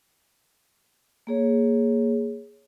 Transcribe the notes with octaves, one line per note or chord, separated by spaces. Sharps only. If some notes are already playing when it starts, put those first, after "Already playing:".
A#3 G#4 C#5